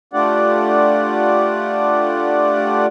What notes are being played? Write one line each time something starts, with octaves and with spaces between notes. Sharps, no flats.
A3 D4 F4 G4 D5 F#5